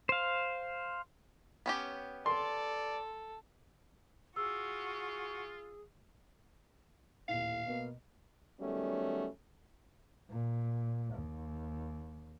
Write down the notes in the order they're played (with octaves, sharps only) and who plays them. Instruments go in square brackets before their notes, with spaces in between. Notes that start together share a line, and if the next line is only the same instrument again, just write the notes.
[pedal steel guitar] C5 F5
[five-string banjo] B3 C#4 G4
[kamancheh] A4 [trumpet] D5 [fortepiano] C6
[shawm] F4 [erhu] F#4 [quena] G#4 [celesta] E6
[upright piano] D#1 A2 [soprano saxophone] F5
[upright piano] B2 A#3 B3
[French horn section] D#3 F#3 G3 A3 B3 C#4
[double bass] A#2
D#2